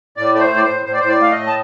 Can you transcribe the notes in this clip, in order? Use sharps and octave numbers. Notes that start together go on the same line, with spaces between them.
A2 D5
A3 D5
C5
A2
D5
C5
A2
A2 C5
D5
A2 C5
D5
A3 F5
D#5
A2
A5